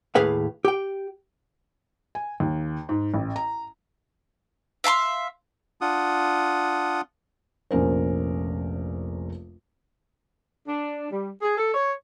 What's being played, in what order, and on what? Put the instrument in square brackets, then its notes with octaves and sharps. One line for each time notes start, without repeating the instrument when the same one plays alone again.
[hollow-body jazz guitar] D#2 A2 G#4 B4 F5
G4 G5
[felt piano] G#5
D#2
G#2
A1
A#5
[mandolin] E5 F5 A5 C6
[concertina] D4 F4 F#5 D#6
[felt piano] F1 A#1 C#4 A#4 C5
[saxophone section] D4
G3
G#4
A4
C#5